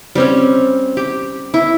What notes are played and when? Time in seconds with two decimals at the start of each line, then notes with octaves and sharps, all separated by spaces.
0.15 G3 C4 C#4
0.97 G4
1.54 E4